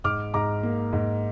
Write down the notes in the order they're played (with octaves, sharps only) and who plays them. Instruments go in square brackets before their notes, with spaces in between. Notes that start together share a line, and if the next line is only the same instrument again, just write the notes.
[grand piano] G#2 D6 F6
G#2 A#5 D6
A#3
G#2